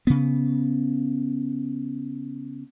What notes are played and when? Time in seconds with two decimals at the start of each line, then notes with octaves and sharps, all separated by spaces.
0.07 C#3 B3